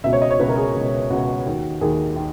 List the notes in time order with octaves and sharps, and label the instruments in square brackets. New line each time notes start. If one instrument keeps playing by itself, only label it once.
[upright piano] C#2 B2 E5
C#5
D#5
C#5
C#2 B2 B4
A#4
G#4
C#2 B2
C#2 B2 F#4
D#2 D#3
D#2 D#3 G#4
D#3